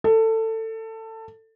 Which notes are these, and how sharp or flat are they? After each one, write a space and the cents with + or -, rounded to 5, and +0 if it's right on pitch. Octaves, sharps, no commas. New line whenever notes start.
A4 +20